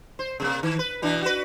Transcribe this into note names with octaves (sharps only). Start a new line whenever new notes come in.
C5
C3 A3 A#3
D#3
B4
B2 E3 D4
F#4 B4